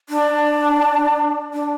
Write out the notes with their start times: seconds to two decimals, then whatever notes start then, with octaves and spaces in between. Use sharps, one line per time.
0.09 D4
1.53 D4